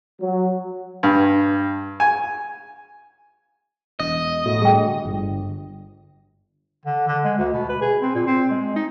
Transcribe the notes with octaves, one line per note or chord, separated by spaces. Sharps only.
F#3
G2
G#5
E1 D#5
A2 F#4
A#2 D3 G3 G#4 G5
G1
D3
D3
G#3
D2
B2
B4
G#4
C4
A#2
C4
G#3
D#4